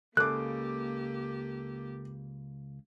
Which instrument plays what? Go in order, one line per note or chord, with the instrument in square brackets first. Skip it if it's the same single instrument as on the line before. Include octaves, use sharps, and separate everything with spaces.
[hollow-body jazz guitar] C#2 C#3 [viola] A#3 G4 [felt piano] A4 D6 [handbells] F#6